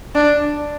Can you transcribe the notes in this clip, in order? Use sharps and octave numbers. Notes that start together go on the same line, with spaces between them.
D4